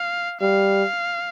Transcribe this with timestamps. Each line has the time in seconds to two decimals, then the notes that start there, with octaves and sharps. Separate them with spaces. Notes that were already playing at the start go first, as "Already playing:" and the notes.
Already playing: F5
0.41 G3 F5